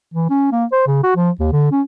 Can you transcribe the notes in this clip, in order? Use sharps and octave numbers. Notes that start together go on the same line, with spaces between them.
E3
C#4
A#3
C5
C#3
F#4
F3
D#2
D3
C#4